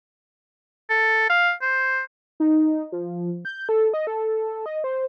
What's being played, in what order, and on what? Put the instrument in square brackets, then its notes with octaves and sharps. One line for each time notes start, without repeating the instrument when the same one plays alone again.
[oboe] A4
F5
C5
[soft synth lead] D#4
F3
G6
A4
D#5
A4
D#5
C5